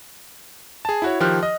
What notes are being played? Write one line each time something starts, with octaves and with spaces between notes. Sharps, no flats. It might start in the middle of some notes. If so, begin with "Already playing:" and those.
G#4 A5
E4 F#4 C#5
D#3 F3 G4 C6 F6 F#6
D#5